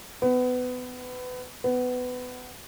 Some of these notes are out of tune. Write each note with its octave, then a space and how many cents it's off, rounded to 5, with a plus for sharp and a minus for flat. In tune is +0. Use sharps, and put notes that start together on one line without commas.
B3 +25
B3 +20